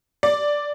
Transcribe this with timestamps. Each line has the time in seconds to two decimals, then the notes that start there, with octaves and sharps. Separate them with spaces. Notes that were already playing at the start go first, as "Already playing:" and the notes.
0.23 D5